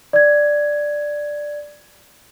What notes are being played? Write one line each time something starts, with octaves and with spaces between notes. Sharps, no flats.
D5 G#6